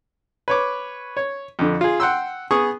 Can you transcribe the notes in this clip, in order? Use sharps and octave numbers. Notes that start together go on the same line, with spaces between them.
B4 C#5 D6
C#5
F2 D3
F4 G#4
F#5 G5 C6 E6
B3 G#4 C#6 D#6